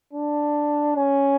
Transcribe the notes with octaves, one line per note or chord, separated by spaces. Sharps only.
D4
C#4